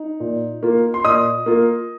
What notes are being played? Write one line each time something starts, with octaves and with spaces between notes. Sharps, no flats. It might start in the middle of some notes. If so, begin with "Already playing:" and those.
Already playing: D#4
A#2
A#3 F4
C6
A#2 D#5 D#6
A#3 F4